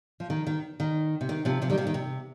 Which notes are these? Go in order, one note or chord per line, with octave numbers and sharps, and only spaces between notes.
F3
D#3
D#3
D#3
C3
D#3
C3 F3
C3 F3
D#3 G3
C3 F3
D#3
C3